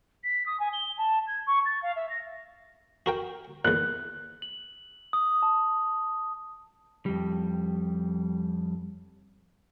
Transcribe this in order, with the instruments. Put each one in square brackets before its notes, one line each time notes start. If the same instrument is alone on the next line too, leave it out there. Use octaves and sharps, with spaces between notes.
[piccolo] B6
D#6
G#5
G7
A5
G#6
C#6
A6
F5
E5
A#6
[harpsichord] F#4 A#4 G5
[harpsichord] E2 A#2 [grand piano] F#6
[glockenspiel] F#7
D#6
A5
[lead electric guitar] F2 G3